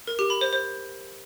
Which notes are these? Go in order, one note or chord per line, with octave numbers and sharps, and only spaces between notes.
A#4
G4
B5
C5
C5